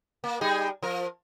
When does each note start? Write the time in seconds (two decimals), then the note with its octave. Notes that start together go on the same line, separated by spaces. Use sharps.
0.24 A#3
0.41 G3 D#4 G#4
0.82 F3 A#4